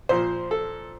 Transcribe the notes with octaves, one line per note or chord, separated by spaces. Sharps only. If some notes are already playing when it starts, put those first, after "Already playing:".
A#2 F3 C5
A4